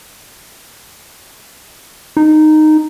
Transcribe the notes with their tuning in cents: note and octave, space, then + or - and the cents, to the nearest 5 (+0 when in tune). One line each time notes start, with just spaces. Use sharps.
D#4 -10